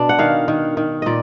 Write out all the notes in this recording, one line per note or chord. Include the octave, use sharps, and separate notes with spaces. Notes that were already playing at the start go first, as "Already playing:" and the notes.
Already playing: B2 D4
F#5
D#3 F5
D#3
D#3
A#2 D5 D#5